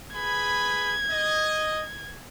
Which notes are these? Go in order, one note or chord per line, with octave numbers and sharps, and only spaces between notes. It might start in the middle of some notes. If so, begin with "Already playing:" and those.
G#4 B4 B5 G#6
D#5